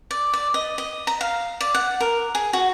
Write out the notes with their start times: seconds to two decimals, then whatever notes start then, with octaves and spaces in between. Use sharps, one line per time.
0.11 D5
0.34 D5
0.54 D#5
0.78 D#5
1.07 A#5
1.21 F5
1.61 D5
1.75 F#5
2.01 A#4
2.35 G#4
2.53 F#4